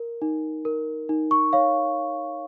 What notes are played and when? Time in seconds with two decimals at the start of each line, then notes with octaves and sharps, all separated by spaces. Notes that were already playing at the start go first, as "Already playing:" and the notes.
Already playing: A#4
0.22 D#4
0.65 A#4
1.09 D#4
1.31 C#6
1.53 C#5 F5